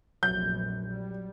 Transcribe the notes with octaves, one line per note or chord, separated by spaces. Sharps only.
F1 A#1 F#2 F#3 G6
G3